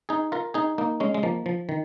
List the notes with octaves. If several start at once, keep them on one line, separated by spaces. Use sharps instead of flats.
D#4 G#4
F4 A#4
D#4 G#4
A#3 D#4
G#3 C#4
G#3
F3 A#3
F3
D#3